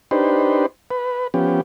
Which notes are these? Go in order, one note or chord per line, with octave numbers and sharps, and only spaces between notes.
D4 D#4 G4 B4 C5
B4
F3 B3 C#4 G4